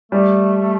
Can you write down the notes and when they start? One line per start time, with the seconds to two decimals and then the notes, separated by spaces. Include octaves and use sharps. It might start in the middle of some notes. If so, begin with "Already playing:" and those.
0.12 G3 A3